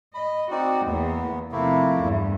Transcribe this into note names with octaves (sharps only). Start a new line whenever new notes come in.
D#5 B5
C4 D#4 F#4 D5
E2 A#3 B3
C3 F3 A3 A#3 E4
E2 G2